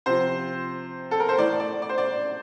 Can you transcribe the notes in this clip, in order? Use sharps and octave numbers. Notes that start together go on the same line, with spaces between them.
C3 F3 C5
A4
A#4
C5
A2 E3 D5
D5
D5
C5
D5